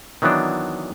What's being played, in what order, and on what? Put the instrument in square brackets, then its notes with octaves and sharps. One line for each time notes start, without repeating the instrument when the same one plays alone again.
[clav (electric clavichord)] D#3 E3 F#3 B3 D4